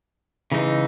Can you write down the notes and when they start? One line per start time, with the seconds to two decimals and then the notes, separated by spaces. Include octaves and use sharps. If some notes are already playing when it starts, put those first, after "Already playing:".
0.52 C#3 E3 G#3 D#4